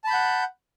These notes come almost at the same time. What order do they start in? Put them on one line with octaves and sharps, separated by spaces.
A5 B5 G6 F#5